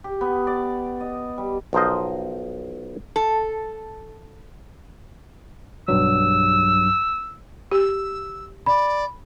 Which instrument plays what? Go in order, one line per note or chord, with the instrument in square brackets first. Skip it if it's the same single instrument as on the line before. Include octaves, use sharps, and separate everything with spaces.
[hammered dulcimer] G4
B3
D5
D#5
G3
[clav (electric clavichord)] B1 F3 A#4 C5 D#5
[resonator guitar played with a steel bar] A4
[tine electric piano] B1 G2 F#3 [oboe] E6
[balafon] G4 [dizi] E6
[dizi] D5 [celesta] B5